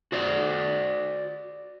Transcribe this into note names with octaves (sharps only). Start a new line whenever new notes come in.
F#4 C5 D5